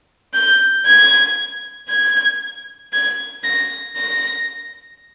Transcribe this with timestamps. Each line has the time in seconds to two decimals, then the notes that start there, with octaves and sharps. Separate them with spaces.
0.34 G6
0.86 G#6
1.89 G#6
2.93 G#6
3.44 A#6
3.96 A#6